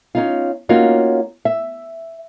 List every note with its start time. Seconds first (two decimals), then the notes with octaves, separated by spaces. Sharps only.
0.15 C#4 D#4 F4
0.69 A#3 C#4 D#4 F4 F#4
1.45 E5